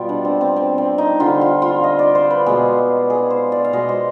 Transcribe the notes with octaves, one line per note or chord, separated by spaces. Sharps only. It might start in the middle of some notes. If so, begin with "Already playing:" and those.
Already playing: B2 G3 F4
D4
C4
C4
C4
C4
D#4
D3 G3 F4
F4
F4
D#5
D5
C5
B4
B2 G#3 G#4
G#4
C5
D5
F5
B2 G#3 D#5
C5